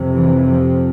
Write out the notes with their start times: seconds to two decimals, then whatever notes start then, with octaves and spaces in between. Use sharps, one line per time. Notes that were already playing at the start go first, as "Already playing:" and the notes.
Already playing: F2 C3
0.15 E3
0.49 F3